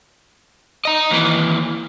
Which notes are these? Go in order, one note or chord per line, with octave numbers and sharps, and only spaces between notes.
D#5 A#5
D#2 E3